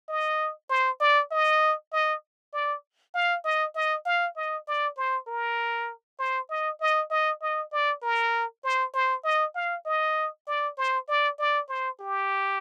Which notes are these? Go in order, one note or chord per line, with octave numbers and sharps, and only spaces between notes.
D#5
C5
D5
D#5
D#5
D5
F5
D#5
D#5
F5
D#5
D5
C5
A#4
C5
D#5
D#5
D#5
D#5
D5
A#4
C5
C5
D#5
F5
D#5
D5
C5
D5
D5
C5
G4